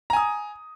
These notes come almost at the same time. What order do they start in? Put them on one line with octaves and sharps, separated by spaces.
A#5 G#5 D#6